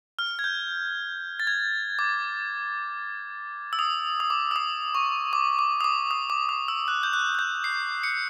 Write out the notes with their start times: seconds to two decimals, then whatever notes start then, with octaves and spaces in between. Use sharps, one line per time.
0.19 F6
0.39 G#6
0.44 G6
1.40 A6
1.47 G#6
1.99 D6
3.73 E6
3.79 D#6
4.20 D#6
4.30 D6
4.51 E6
4.56 D#6
4.95 C#6
5.33 D6
5.59 D6
5.81 D#6
5.84 D6
6.11 D#6
6.30 D6
6.49 D#6
6.68 E6
6.88 F#6
7.03 G6
7.13 F#6
7.35 F#6
7.39 G6
7.64 C7
8.03 C#7